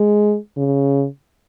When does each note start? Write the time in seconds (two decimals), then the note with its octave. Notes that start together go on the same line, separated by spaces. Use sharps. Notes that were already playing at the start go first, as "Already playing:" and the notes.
Already playing: G#3
0.57 C#3